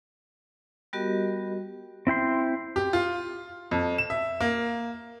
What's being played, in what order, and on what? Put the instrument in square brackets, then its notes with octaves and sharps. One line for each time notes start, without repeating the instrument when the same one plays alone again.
[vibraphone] G3 B3 F#4 G4 A#4 D#5
[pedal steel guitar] C4 E4 G5 C6
[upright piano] G4
F4
F2
E7
E5
A#3